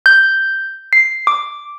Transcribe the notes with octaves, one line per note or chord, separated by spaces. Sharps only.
G6
C7
D6